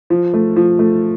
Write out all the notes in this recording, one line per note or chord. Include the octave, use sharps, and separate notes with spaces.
F3
A3
F3
A3